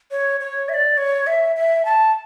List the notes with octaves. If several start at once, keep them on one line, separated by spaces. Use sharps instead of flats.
C#5
C#5
E5
D5
C#5
E5
E5
A5